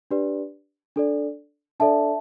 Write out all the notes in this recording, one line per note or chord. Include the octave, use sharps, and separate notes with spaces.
D4 G4 B4 D5
D4 A4 D5
D4 A4 D5 E5 A5